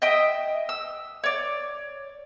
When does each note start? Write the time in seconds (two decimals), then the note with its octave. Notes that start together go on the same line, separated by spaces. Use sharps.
0.02 D#5 E5 G5 D#6
0.69 E6
1.24 C#5 D5